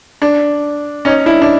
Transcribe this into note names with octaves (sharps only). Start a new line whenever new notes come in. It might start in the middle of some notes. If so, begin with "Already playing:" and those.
D4
C#4 D#4
D4 E4
D4